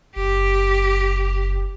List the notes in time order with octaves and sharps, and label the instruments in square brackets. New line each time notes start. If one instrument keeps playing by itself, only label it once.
[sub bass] F#1 [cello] G4